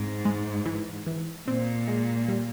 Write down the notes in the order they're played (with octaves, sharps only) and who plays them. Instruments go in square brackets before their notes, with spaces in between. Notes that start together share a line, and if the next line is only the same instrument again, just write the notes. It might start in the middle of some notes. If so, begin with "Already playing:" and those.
Already playing: [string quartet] G#2 [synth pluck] C4
[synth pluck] G#3
E3
E3
[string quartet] A#2 [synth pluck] C4
[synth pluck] G#3
G3